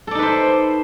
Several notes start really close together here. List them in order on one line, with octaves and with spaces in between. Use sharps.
A4 D5 D#4 B4 C5